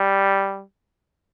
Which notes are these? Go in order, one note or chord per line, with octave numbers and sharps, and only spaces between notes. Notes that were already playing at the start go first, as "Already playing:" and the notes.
Already playing: G3